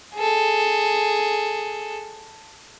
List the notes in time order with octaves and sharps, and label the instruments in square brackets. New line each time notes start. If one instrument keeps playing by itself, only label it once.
[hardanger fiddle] G#4 A4